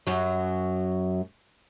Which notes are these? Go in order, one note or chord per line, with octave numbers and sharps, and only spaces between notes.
F#2 F#3